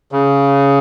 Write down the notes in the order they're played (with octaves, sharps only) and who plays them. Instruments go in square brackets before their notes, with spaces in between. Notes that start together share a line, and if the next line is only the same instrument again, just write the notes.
[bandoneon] C#3